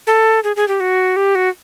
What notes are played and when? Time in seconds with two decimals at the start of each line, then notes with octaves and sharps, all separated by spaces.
0.07 A4
0.44 G#4
0.56 G#4
0.68 G4
0.80 F#4
1.16 G4
1.35 F#4